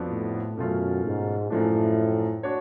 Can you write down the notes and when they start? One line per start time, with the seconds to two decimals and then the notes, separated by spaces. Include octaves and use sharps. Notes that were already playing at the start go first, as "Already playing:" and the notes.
Already playing: F2 F3 B3 D4 F#4
0.10 A2
0.57 F#2 B2 A3 C#4 F4
1.04 G#2
1.50 F#2 A2 F3 A3 D4
2.43 D4 F#4 C#5